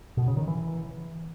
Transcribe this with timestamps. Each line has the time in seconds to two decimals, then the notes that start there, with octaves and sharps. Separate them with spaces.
0.17 B2
0.28 C#3
0.37 D#3
0.47 E3